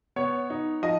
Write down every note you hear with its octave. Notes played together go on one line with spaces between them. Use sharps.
B3 C#5
D#4
F3 D#5